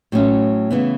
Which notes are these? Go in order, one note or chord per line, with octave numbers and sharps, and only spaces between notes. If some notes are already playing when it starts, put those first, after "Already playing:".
A2 F#3 C#4
C#3 E3 B3